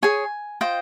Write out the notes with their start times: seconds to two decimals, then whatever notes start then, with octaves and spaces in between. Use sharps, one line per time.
0.03 G#4 C#5 G#5
0.61 F4 C5 D#5 G5